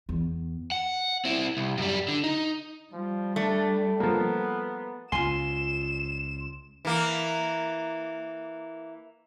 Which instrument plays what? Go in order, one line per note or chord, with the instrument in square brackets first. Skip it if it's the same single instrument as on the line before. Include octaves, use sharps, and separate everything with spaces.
[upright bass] E2
[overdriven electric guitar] F#5
C4 E4
C2
F#2 G3
D3
D#4
[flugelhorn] F3 [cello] G3
[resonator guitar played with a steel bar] A3 [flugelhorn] D4
[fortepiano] F3 A#3 [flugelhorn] B3
[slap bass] C#2 [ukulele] F4 G#5 [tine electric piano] C6 [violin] E7
[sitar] E3 A#3